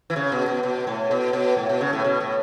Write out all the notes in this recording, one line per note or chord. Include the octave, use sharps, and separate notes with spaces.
E3
C#3
B2
B2
B2
A2
B2
B2
A2
B2
C#3
A2
B2
A2